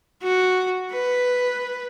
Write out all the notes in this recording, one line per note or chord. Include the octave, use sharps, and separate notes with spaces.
F#4
B4